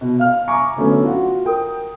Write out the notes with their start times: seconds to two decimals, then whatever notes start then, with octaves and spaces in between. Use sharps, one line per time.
0.01 B2
0.19 F5 F6
0.48 E5 G#5 A#5 C#6 D6
0.76 D3 F#3 A3 B3 C#4
1.04 F4 F#4
1.45 A#4 G5 D#6